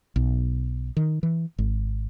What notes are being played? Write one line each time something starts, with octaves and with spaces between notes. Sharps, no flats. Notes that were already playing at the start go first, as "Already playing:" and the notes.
B1
D#3
E3
G#1